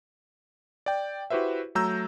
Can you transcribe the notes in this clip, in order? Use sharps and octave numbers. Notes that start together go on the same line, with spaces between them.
D5 G5
E4 F#4 G4 B4 C5 E5
F#3 A3 A#5 E6 G6